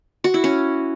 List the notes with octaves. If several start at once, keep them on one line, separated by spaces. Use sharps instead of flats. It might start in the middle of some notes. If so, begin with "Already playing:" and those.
F#4
E4
C#4